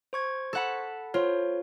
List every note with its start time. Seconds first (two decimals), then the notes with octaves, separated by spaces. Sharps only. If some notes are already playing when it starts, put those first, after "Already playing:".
0.13 C5 C#6 G#6
0.53 A4 F#5 B5
1.14 F4 C5 C#5